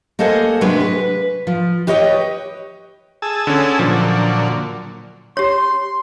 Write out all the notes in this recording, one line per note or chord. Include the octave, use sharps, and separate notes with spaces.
A#3 A4 C5 D#5 F#5 G#5
C3 F#3 G#3 D4 G#4 B4
B4
F3
G4 B4 C#5 D#5 F5 G5
G#4 A5 E6
D3 C#4
A#2 D3 F3 F#3
G4 C#5 C6